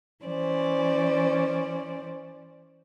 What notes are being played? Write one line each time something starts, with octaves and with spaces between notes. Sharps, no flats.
E3 C#4 C5 D5